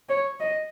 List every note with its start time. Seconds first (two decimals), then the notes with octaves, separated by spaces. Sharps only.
0.09 C#5
0.40 D#5